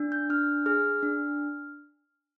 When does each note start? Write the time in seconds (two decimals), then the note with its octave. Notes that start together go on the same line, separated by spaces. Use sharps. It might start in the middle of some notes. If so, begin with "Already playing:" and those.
Already playing: D4
0.12 G6
0.30 D4 F6
0.66 G#4 F6
1.03 D4